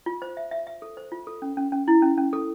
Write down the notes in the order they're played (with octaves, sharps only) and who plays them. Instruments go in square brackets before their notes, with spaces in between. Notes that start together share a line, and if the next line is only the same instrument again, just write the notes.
[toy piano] F4
C5
E5
E5
E5
A4
C5
F4
A4
C#4
C#4
C#4
E4
C#4
C#4
A4